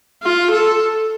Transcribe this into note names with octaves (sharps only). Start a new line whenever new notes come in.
F4
A4